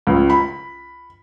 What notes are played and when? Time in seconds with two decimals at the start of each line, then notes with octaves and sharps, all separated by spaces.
0.07 C#2
0.30 B5